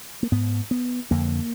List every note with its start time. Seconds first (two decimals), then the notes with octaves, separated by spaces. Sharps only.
0.23 A#3
0.32 G#2 B3
0.71 B3
1.11 F2 D3 A#3